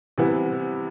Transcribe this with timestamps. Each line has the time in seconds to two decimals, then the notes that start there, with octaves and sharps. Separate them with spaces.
0.18 C3 E3 G3 B3 E4